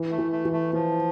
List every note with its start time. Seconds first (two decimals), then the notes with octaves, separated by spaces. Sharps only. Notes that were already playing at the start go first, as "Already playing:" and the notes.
Already playing: E3
0.11 A3
0.18 E3
0.32 A3
0.45 E3
0.52 A3
0.73 E3 F3